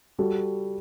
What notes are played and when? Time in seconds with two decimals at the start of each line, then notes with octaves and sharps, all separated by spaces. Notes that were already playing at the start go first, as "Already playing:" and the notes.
0.19 G3 F#4 A4